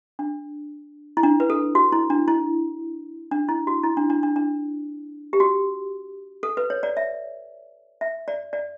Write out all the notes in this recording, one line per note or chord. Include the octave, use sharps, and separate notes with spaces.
D4
E4
D4
B4
A4
F#4
E4
D4
E4
D4
E4
F#4
E4
D4
D4
D4
D4
G4
F#4
A4
B4
C#5
D5
E5
E5
D5
D5